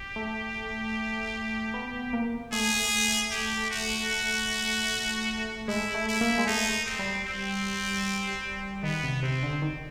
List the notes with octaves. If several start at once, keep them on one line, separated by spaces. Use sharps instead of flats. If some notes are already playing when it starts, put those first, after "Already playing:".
Already playing: G4
A3
B3
A#3
A3 G#4
G4
F#4
G#3 E4
A3
E4
A#3
G#3
A3 D#4
C4
G3
C4
D#3 B3
C3
C3 C4
D3
D#3